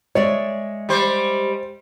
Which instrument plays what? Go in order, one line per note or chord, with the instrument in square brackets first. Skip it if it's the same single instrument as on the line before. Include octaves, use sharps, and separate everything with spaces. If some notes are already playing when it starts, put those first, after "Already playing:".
[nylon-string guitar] G#3 D5 E5 [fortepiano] C#5
[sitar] G3 C5